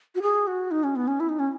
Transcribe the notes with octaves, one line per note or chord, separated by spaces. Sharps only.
F#4
G#4
F#4
D#4
C#4
B3
C#4
E4
D#4
C#4